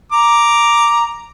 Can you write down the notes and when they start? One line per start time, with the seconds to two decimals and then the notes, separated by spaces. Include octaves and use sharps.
0.12 A#5 D6